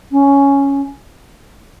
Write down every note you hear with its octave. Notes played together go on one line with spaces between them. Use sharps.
C#4